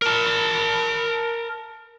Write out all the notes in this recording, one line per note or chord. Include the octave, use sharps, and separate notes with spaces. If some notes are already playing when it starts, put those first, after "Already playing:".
A#4 A5